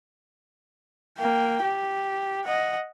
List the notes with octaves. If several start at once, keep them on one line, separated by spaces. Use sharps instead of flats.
A#3 G5
G4
D#5 F#5